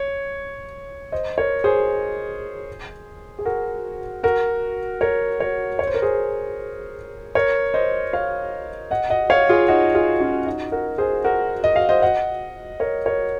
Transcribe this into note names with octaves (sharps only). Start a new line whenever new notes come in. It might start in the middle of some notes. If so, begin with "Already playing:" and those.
Already playing: C#5
C5 D#5
A#4 C#5
G#4 C5
G#4
F#4 A#4
F#4 A#4
A#4 C#5
A#4 C#5
C#5
C5
A#4
G#4 C5
A#4 C#5
C5 D#5
C#5 F5
D#5 F#5
D#5 F#5
C#5 F5
F4 G#4
D#4 F#4
F4 G#4
C#4 F4
D#4 F#4
F#4 A#4
G#4 C5
F#4 A#4
D#5
F5
C5 D#5
D#5 F#5
A#4 C#5
A#4 C#5